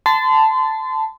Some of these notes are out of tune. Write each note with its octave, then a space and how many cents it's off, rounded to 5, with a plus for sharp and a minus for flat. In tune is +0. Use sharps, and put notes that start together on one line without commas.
A5 +0 C6 -35